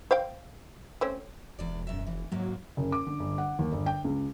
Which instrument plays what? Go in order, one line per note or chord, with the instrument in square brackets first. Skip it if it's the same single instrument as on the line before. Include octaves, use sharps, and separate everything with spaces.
[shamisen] C5 F5 G5
A3 C4 C#4
[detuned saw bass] E1 [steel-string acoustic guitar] E2 D5
[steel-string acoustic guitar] F#2 E5
[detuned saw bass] F1 [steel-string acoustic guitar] E3
[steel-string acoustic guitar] G#2 A#3 [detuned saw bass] F#3
[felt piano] F#1
D6
D3
G1
F#5
D#2
G1
G5
C#2